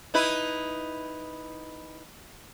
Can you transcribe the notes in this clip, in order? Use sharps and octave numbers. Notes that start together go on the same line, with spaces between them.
D#4 E4 B4